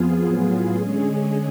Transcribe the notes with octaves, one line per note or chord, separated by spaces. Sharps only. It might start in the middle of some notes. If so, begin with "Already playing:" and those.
Already playing: F2 F3 B3 F4 G#4
A2 F#3 B3 F4 G#4
D3 G#3 C#4 G#4